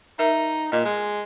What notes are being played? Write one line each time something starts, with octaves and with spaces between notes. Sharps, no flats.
D#4 A#4 E5
A#2 D#5
G#3